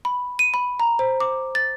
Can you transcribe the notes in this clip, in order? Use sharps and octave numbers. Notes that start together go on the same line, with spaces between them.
B5
D#7
B5
A#5
C5
D6
A6